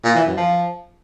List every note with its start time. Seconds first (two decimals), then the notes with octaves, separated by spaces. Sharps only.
0.04 A#2
0.15 E3
0.26 F#2
0.37 F3